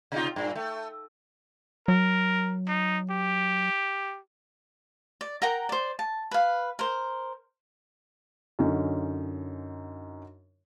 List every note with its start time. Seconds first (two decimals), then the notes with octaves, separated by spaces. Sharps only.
0.12 C3 D#4 F4
0.36 G2 A#2
0.55 A3
1.88 F#3 A#4
2.68 D#4
3.11 G4
5.21 D5
5.42 A#4 F#5 G5 A#5
5.69 C5 D5
5.99 A5
6.31 B4 F5
6.79 A#4 C5
8.59 F#2 D3 C#4 D#4